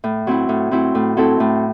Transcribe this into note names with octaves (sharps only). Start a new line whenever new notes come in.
A2
F#3 C4 E4
A2
F#3 C4 E4
A2
F#3 C4 E4 A4
A2